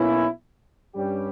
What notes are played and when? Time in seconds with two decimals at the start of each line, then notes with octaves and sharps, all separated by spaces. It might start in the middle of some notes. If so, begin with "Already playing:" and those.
Already playing: B1 B2 A#3 C#4 E4
0.95 G2 G3 C#4 G4